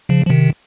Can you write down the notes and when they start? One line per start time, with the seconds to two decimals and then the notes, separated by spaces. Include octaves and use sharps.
0.09 C#3 F3
0.26 F3
0.30 C3 D#3